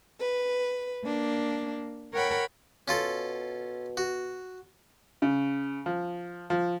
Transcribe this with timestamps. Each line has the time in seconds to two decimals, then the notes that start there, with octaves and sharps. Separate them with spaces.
0.19 B4
1.04 A#3 D4
2.13 A#4 C#5 F#5 G5 B5
2.88 B2 C#4 F4 A4
3.97 F#4
5.22 C#3
5.86 F3
6.50 F3